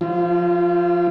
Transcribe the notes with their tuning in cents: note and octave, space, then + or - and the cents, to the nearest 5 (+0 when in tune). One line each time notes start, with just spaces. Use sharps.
F3 +0 F4 -35